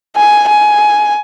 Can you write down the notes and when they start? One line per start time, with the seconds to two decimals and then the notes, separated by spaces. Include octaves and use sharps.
0.17 G#5
0.48 G#5